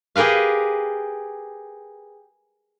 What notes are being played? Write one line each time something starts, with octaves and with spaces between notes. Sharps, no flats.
G4 G#4 A#4 B4 F5